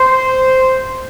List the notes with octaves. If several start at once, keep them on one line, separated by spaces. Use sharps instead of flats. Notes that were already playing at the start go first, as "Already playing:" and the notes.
Already playing: C5